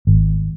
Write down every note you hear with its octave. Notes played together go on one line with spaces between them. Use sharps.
G#1